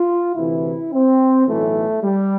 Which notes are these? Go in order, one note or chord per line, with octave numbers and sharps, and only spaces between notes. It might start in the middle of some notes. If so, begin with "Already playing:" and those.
Already playing: F4
D2 C3 E3 E4
C4
B1 A2 E3 A3
G3